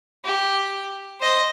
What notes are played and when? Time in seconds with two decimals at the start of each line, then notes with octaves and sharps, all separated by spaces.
0.25 G4
1.20 C5 D#5